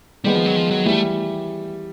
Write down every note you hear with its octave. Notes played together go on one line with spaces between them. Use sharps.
D#3 G3 G#3 B3
F3
F#3
F3
F#3
E3 G3 A3